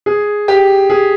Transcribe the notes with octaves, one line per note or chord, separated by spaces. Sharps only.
G#4
G4
G#4